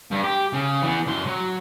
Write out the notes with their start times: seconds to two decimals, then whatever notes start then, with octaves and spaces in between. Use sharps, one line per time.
0.11 G2
0.24 G4
0.53 C#3
0.82 E3 B3
1.07 F#2 C6
1.26 F#3